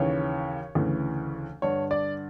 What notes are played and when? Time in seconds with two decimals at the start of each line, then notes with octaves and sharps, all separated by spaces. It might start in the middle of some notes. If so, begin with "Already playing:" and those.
Already playing: D#2 C#3 E3 C#5
0.75 D2 C#3 E3
1.62 G2 D3 C#5
1.91 D5